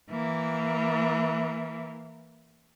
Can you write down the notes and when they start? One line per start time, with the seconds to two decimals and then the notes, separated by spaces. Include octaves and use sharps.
0.11 E3 A#3